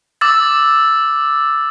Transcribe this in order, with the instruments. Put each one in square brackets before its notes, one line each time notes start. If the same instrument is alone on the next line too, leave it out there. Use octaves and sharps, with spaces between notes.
[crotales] D6 E6 A6